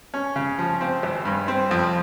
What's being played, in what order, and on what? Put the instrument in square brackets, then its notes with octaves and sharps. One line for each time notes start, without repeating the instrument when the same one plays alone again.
[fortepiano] C#4
C#3
F3
C4
G#1
G2
C4
F2